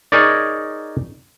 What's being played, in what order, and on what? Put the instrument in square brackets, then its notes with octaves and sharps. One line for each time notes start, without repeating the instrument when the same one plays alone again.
[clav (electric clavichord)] D#4 G#4 A#4 C#5 D5